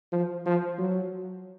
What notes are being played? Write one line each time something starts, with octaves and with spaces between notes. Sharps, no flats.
F3
F3
F#3